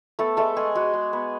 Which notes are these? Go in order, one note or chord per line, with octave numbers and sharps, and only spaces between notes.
A3 B3 A4
G#3 A3 A4
G#3 G#4
G#3 F#4
G#3
B3